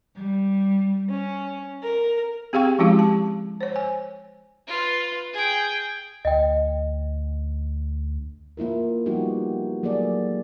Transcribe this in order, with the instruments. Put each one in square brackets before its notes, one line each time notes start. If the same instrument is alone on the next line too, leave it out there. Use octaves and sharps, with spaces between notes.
[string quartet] G3
C#4
A#4
[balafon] C4 G4 G#4 F5 G5 C#6
F3 G#3 C#4 E4 F#4 G4
A5
C5 C#5
G#5
[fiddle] F4 B4
G#4 G5
[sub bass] D2 [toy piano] D#5 G5
[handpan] A#3 E4 F4 A#4
F3 G3 B3 D#4 F#4 G4
F#3 A#3 G#4 A4 D5